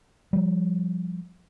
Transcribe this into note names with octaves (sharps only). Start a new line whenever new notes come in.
F3 G3